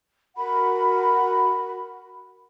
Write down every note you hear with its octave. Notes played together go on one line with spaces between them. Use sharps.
F#4 A#4 F#5 B5